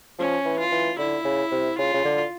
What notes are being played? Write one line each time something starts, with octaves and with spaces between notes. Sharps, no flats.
F3 C#4
E3
F4
E3
D3 E4
C#3
C3
C#3 F4
C#3
D3